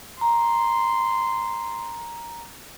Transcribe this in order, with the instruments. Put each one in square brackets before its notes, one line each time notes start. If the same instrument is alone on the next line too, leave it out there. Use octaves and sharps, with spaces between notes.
[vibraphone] A#5 [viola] C6